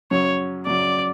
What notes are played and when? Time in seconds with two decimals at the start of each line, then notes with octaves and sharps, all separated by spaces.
0.11 F#2 C#3 F#3 C#5
0.67 F#2 C#3 F#3 D5